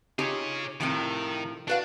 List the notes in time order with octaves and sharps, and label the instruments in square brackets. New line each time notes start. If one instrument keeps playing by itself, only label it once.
[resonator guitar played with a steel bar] D#4 F4 G4 [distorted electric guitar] G#4 C#5
[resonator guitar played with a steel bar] A2 C3 F3 [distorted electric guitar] D#3
[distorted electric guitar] D4 [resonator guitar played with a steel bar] F#4 B4 F5